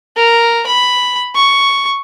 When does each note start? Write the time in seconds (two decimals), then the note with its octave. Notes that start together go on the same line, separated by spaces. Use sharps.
0.16 A#4
0.67 B5
1.35 C#6